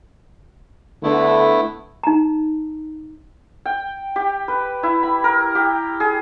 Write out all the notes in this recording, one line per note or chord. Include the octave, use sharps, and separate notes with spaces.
D3 A3 B3 E4
D#4 A#5
G5
G4
B4
E4
B5
A#4
G4
G#4